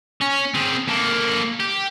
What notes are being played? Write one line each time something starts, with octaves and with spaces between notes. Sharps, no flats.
C#4
C4 G#4
A#3 A4
G4